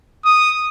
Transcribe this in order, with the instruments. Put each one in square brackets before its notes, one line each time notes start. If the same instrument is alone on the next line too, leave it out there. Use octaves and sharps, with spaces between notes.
[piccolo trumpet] D#6